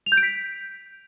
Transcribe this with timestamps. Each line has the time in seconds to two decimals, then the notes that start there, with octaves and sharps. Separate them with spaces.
0.06 F7
0.12 G6
0.17 D7
0.23 B6